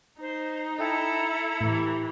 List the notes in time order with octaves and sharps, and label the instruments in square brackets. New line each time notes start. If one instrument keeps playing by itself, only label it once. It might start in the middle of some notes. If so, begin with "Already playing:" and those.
[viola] D#4 [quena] C5
[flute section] E4 E5 A#5 [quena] A4 [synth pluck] D#5 G5 A5
[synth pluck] A2 [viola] E3 G4